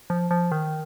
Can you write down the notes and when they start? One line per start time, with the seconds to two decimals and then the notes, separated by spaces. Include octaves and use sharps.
0.10 F3
0.31 F3
0.52 D#3